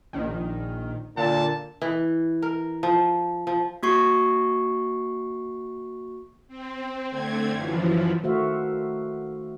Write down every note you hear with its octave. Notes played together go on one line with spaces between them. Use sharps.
A#1 D#3
A#2 D3 A5
E3
A#4
F3
F3
A#3 F#4 C#6 C7
C4
D3 A3 C4 G#6
F#2 E3 F3
D#3 A3 F#4 C5 E5 F5